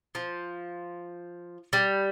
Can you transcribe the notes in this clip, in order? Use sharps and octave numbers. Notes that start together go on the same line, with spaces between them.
F3
G3